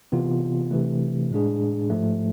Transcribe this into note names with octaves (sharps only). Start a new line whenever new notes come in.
C3 E3 B3 F4
C3 E3 A3
A2 G#3 D4 G#4
G#2 F3 A3